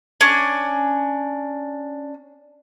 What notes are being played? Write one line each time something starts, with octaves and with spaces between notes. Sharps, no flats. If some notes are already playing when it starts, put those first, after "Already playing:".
C#4 D4